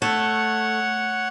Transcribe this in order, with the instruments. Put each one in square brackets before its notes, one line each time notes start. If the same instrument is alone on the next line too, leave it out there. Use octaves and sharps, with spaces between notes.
[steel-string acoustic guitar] A3 [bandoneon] C#5 F#5